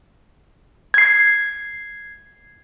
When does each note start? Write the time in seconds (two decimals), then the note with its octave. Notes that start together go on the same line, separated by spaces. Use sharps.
0.94 G#6 C7